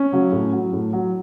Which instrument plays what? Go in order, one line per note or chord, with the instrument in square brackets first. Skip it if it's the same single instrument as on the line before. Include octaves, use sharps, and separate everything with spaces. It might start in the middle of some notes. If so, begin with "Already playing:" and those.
Already playing: [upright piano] C#4
C#3 F#3
A2
F#3
A2
F#3